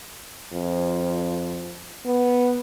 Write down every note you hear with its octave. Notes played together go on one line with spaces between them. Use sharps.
F2
B3